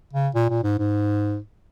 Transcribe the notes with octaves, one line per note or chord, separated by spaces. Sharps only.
C#3
A#2
A#2
G#2
G#2